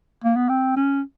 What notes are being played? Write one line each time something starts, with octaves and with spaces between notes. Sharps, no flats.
A#3
B3
C4
C#4